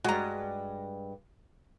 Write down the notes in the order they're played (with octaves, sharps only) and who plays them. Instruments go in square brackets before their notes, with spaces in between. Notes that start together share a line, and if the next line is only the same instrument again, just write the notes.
[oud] G2 G#3 [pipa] F#4 A#5